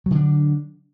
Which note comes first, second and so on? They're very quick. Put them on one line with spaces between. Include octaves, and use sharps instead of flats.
F#3 D3 D4